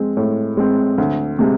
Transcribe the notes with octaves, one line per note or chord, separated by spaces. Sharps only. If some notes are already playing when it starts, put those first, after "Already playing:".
Already playing: G#3 C4
A2
G#3 C4
D2
C3 G#3